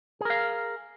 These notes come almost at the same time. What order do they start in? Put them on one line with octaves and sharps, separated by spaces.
G#4 A#4 F5